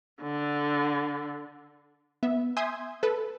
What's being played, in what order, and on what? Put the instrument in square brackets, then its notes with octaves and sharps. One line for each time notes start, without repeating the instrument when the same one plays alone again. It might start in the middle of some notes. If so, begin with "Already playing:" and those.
[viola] D3
[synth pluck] B3 E5
E5 G#5 C6 D#6 G6 G#6
A4 B4